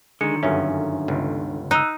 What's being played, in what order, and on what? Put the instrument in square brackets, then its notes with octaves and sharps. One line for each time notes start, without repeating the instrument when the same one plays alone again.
[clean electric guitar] D3 D#3 [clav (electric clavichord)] G#3 [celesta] C#7
[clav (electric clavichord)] G1 F#2 C#4 [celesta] E5
[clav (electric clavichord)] G1 C#2
[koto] D#4 [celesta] E6 F#6